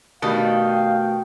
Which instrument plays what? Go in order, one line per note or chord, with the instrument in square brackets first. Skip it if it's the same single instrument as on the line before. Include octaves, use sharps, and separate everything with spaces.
[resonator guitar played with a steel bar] B2 D#3 G3 [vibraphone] A3 F#4 [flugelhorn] F5 [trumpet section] G5